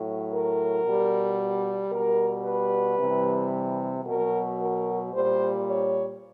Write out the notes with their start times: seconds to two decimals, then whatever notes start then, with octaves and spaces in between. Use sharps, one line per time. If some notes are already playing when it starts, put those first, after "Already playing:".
Already playing: A2 F#3
0.31 A#4
0.83 B2 G3
1.91 B2 G3 A#4
2.44 B4
2.99 C3 E3 G3
4.05 B2 F#3 A#4
4.59 A#4
5.13 A#2 G3 C5
5.66 C#5